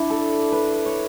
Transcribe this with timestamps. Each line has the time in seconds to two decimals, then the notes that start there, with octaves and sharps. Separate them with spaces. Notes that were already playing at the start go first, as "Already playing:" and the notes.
Already playing: D4 E4
0.10 A4
0.52 B4
0.86 C#5